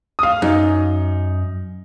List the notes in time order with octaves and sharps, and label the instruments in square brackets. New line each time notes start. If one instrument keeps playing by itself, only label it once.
[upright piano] F5 D#6
[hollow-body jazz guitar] F#2 [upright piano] D#4